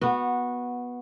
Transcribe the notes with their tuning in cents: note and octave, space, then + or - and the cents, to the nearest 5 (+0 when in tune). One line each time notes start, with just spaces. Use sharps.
B3 -10 F#4 -15